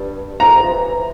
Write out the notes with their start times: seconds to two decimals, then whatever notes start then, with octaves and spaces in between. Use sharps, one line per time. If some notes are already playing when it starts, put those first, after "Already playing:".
Already playing: G2
0.40 F2 A#5
0.51 C3
0.61 F3
0.72 E3